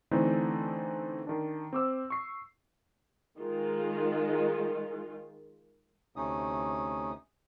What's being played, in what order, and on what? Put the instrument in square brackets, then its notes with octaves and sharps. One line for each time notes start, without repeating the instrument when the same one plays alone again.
[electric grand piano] D3 E3 A3 C4 D4 D#4
D#3 D4
C4 D6 E6
C#6 C7
[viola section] D#3 G#3 F4
[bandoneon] D2 C3 A3 C#4 D#4 D#6